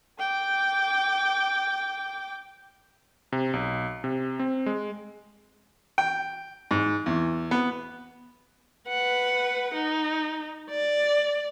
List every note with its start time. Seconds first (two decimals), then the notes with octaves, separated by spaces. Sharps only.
0.19 G5 D6
3.32 C3
3.53 B1
4.04 C3
4.39 C4
4.66 G#3
5.98 G5
6.71 G#2
7.06 E2
7.51 B3
8.88 B4 F#5
9.74 D#4
10.70 D5